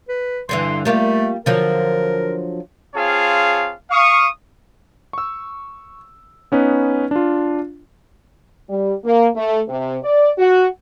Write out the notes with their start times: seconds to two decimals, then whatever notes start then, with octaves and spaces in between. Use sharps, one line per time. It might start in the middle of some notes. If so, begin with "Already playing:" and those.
0.09 B4
0.49 G2 D3 E3 C6
0.85 G3 A3 A#3 F4
1.46 D3 F3 F#3 A#4
2.95 C4 F4 G#4 C#5 F5 A5
3.90 F5 C#6 D#6
5.13 C#6 E6
6.52 B3 C#4 D#4 B4
7.11 D4 F4
8.69 G3
9.05 A#3
9.35 A3
9.68 C3
10.03 D5
10.38 F#4